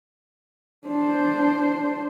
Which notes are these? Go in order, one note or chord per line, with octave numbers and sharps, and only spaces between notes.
D4 C5